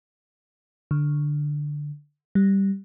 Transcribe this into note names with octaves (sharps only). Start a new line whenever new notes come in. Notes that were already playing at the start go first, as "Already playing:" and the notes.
D3
G3